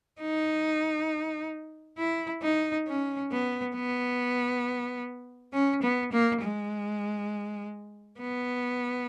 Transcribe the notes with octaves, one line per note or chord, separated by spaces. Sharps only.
D#4
E4
D#4
C#4
B3
B3
C#4
B3
A#3
G#3
B3